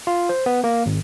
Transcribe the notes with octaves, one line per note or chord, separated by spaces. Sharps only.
F4
C5
B3
A#3
G#1